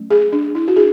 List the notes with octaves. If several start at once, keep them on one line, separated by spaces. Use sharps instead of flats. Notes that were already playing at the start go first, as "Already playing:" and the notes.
Already playing: F#3 A3 C#4
G#4
D4
E4
F#4
D4 G#4